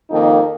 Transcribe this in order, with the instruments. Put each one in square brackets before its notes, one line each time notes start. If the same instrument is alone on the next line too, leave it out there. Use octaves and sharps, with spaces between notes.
[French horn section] F2 D#3 A#3 D#4